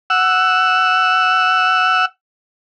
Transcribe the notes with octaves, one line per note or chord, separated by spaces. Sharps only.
F#5 E6